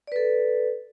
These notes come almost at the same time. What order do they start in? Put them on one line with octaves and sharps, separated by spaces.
D5 B4 A4